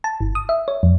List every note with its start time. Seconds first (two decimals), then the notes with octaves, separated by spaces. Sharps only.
0.04 A5
0.21 G1
0.35 D#6
0.49 E5
0.68 C#5
0.83 F2